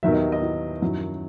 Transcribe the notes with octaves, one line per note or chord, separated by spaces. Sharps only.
D#2 D#3 F#3 B3 E5
D#5
D#5
E4
F#2 D#3 F#3 E4